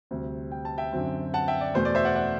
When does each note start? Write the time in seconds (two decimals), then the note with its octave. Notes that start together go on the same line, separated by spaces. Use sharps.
0.11 D2 C3 G3 C4
0.51 G5
0.65 A5
0.78 E5 G5
0.93 F#2 D3 F#3 C4
1.34 F#5 A5
1.48 E5 G5
1.61 D5
1.74 E2 B2 A3 C5
1.85 D5
1.95 C5 E5
2.05 D5 F#5
2.15 D5 F#5